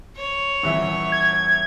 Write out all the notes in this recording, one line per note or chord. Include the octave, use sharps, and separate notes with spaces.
C#5
D#1 E3 E5
G#6